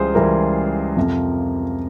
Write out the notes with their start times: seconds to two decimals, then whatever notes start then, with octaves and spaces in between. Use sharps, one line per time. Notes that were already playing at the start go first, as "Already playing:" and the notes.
Already playing: C#2 C#3 E3 G3 F4 G#4 C5
0.15 C#2 C#3 E3 G3 A#4
0.97 F2 C3 F3